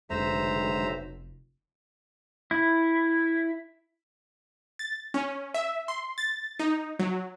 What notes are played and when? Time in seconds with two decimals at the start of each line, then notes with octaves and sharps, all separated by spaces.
0.10 F1 B1 B2 D3 G#3 C5 E5 A#5
2.51 E4
4.79 A6
5.14 C#4
5.54 E5
5.88 C6
6.18 A6
6.59 D#4
6.99 F#3